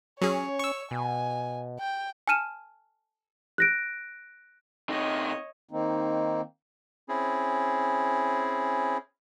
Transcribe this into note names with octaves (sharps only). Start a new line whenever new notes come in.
F#3 C#4 G#4 C#5
C#6 E6
B2 G#5
G5
G#5 A5 F6 D#7 E7
F#6 A#6 D7
C3 D#4 C#5 D#5
D#3 A#3 C4 D#4
C4 C#4 E4 G#4